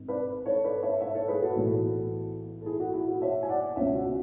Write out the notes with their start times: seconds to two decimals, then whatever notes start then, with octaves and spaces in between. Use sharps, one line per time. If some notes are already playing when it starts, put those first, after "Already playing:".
Already playing: G#1 G#2
0.08 B4 D5
0.46 A4 C#5
0.64 B4 D5
0.83 C#5 E5
1.01 C#5 E5
1.14 A4 C#5
1.28 G#4 B4
1.42 F#4 A4
1.56 B1 A2 E3
2.61 A4
2.66 E4 G#4
2.80 F#4
2.94 E4
3.08 F#4
3.21 C#5 E5
3.43 G#5
3.49 D5 F#5
3.76 C#2 B2 C#5 E5
3.95 F#4